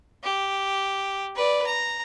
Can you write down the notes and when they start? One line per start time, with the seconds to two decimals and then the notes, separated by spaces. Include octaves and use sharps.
0.23 G4
1.35 B4 D5
1.66 A#5